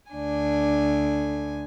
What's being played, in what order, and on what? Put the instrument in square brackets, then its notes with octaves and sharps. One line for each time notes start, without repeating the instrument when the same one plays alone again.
[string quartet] D2 D4 G#5